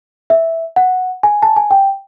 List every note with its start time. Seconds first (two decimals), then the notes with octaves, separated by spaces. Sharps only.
0.30 E5
0.76 F#5
1.23 G#5
1.42 A5
1.56 G#5
1.71 G5